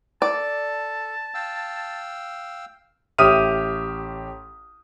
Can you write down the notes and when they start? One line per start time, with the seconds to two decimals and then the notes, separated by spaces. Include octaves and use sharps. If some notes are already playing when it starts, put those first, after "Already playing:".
0.22 A4 D5 A5
1.34 F5 G5 E6
3.18 A1 G4 E5 D#6 F6 D#7